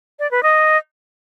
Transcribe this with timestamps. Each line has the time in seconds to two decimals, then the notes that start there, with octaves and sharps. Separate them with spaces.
0.19 D5
0.31 B4
0.43 D#5